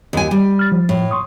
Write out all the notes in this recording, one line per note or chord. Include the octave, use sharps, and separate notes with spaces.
D#2 G#5
G3
F6 A6
F3
A2
C6 C#6 D#6